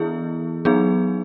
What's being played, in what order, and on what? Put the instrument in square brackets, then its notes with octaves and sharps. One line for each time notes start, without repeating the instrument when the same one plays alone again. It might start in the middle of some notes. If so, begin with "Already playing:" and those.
Already playing: [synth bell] E3 B3 E4 G#4
F#3 B3 D#4 G#4